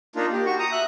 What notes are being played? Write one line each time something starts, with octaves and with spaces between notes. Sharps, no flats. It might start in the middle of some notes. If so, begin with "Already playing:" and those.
A#3 D4 D#4 F4
G4
F#4 C#6
A#5 D#6
E5 F#6